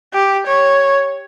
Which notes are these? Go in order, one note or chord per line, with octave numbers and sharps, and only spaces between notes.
G4
C#5